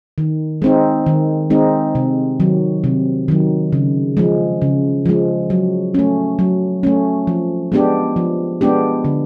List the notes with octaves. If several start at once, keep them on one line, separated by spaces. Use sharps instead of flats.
D#3
G#3 C4 D#4
D#3
G#3 C4 D#4
C3
D#3 F#3
C3
D#3 F#3
C#3
F3 G#3
C#3
F3 G#3
F#3
A3 C#4
F#3
A3 C#4
F3
G#3 B3 D4 G4
F3
G#3 B3 D4 G4
D3